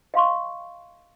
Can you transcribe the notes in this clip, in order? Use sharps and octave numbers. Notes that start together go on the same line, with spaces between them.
D#5 F5 C6 C#6